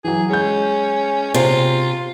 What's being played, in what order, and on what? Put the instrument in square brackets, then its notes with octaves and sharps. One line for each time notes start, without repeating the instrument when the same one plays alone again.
[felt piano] E3 F#3 [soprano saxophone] G#4
[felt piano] G#3 G6 [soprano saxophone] C#4
[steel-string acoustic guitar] C3 [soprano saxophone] F4